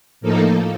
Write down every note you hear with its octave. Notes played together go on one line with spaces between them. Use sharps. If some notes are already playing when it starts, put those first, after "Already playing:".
A2 F3 A#3 D#4 A4